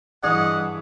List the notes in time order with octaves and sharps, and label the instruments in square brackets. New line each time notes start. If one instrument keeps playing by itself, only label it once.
[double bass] G2 E3 [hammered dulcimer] G#4 C#5 [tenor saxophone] D#5 [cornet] F#5